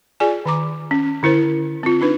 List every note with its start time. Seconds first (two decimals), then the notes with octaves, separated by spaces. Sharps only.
0.20 F4 G#4 D5 G#5
0.46 D#3 A#5 D6
0.91 C#4
1.23 D3 E4 A#4 C5
1.83 C4 F4
2.01 D4 D#4 F4 B4